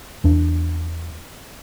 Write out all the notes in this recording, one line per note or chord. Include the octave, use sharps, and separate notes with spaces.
E2 D4